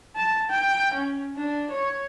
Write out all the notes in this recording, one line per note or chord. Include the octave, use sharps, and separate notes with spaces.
A5
G5
C#4
D4
C#5